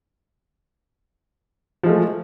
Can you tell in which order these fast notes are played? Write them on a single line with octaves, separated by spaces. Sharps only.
F3 G#3 A3